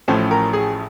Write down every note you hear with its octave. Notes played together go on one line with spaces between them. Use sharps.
A1 A2 F3 A3 C#4 C5
A#4
G#4